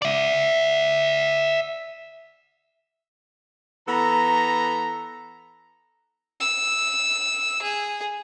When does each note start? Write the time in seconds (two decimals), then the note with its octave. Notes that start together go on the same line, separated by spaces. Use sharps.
0.02 D5 E5
3.87 E3 B3 A4 A#5
6.40 E6
7.62 G#4